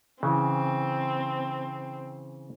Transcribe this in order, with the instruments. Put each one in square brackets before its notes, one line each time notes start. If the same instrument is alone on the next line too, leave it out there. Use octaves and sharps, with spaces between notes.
[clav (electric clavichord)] C#3 E3 [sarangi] C4